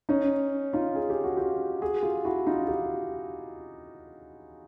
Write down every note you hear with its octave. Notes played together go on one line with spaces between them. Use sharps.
C#4 D#4
D#4 F4
G#4
G4
F#4
F4 G4
F#4 G#4
F4 G4
E4 F#4
D#4 F4
F4 G4